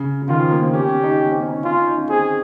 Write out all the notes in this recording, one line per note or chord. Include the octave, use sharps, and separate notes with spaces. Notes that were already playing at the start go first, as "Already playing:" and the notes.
Already playing: C#3
C#3
D#3 F4
F3
A#3
C4
C#4 G4
C#4
D#4
C#4
C4
C#4
D#4
C#4
C#4 F4
D#4
D#4
C#4
C4 G#4